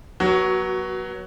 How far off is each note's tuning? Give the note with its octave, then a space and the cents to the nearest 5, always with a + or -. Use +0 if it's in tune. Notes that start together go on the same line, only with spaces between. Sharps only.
F#3 +0 B3 -30 F#4 +20